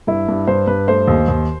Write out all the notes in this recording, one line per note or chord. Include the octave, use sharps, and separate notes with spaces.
G2 E4
G2
G2 C5
G2 B4
A3 C5
D#2
D#2